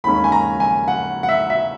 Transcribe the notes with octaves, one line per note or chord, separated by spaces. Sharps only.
D#2 D#3 G#3 C#4 B5
G#5
A#5
G#5
F#5
F#5
E5
E5